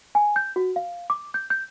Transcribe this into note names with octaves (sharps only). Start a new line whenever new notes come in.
G#5
G6
F#4
F5
D6
G6
G6